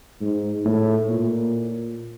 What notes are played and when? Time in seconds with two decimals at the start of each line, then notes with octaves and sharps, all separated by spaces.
0.21 G#2
0.65 A2
1.09 A#2